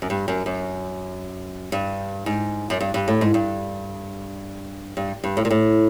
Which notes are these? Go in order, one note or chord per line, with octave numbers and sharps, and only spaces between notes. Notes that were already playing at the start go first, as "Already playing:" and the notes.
F#2
G2
F#2
F#2
G2
G#2
F#2
G2
G2
A2
G#2
G2
G2
G2
A2
A#2
A2